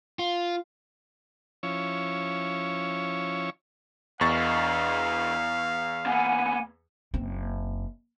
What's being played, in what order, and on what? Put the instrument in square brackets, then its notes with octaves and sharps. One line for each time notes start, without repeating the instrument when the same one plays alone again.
[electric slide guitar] F4
[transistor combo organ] F3 C#4 E4 C#5
[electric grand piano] E2 C#6 A6 [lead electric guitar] E3 D#5 [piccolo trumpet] F5
[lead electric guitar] A#3 B3 [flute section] F#5 G#5
[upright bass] F#1 C4